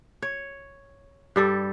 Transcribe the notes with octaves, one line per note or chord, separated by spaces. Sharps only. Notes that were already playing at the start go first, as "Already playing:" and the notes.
C#5
G2 G3 A4